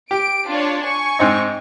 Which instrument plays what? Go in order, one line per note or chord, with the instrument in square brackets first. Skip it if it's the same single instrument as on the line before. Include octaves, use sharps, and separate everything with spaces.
[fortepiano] G4 [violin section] D7
[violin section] D4 F4 C#5
G#5 C#6
[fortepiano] G#2 C4 D#4